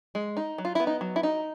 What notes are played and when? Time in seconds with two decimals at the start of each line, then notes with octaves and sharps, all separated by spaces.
0.15 G#3
0.37 D#4
0.58 F#3
0.65 F4
0.75 B3 E4
0.87 D#4
1.01 F#3
1.16 E4
1.23 D#4